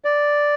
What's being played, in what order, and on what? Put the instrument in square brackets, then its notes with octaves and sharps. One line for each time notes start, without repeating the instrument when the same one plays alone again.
[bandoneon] D5